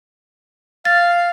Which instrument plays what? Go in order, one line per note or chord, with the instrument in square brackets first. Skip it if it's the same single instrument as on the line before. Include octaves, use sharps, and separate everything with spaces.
[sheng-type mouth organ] F5 [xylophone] A6